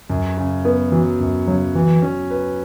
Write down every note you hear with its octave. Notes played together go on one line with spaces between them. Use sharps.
F#2
C#3
B3
E3 F#3
F#2
C#3 F#3
E3 F#3
C#4
B4